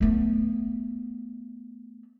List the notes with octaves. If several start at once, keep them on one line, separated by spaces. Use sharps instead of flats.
A3 B3